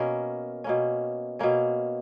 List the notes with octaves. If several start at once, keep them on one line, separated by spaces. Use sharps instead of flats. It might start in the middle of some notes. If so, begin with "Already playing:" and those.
Already playing: B2 A#3 C#4 A#4
B2 A#3 C#4
B2 A#3 C#4